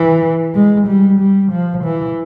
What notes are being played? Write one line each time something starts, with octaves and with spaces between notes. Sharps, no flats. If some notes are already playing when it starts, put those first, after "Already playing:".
Already playing: E3
G#3
G3
G3
F3
E3